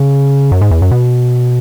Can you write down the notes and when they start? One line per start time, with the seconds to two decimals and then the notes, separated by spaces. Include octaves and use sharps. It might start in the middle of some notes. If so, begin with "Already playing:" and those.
Already playing: C#3
0.52 F#2
0.61 G#2
0.71 E2
0.82 F#2
0.91 B2